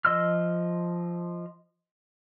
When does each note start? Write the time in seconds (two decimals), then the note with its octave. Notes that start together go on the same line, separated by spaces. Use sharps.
0.05 F3 D#5 C6 E6 F6